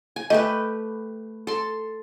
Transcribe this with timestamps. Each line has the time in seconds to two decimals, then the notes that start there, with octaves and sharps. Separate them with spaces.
0.16 G#5
0.30 A3 G4 B4 D#5
1.47 A4 C6